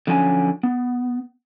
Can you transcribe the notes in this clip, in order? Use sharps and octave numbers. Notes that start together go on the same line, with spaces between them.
D3 F3 F#3 C#4 G5 G#5
B3